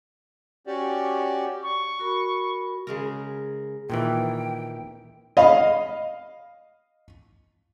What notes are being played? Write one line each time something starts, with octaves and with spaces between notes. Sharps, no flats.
C#4 F#4 G4 D5
C#6
F#4 A#4 B5
C#3 G#3 A#4
A#2 D#3 E3 G5
D#5 F5 B5